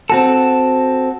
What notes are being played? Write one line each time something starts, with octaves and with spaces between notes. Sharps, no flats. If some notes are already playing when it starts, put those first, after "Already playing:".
C4 F#4 A4